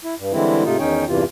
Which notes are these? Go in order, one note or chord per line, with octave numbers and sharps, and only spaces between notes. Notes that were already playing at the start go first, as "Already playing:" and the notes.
E4
G2
D3 E3 G3 G#3 C4 E4
G#2 C3 A3 D#4 F4
E2 D#3 C#4 D#4 C#5 G5
E2 G2 C3 E3 F4